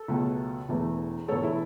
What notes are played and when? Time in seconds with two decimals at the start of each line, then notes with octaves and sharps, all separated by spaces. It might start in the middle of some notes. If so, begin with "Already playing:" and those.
Already playing: A4
0.08 C#2 B2 F#3 A3
0.69 E1 E2 E3 A3
1.28 E1 E2 E3 A3 A4 C#5
1.43 E4 A4